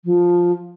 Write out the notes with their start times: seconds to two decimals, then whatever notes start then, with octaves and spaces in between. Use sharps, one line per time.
0.05 F3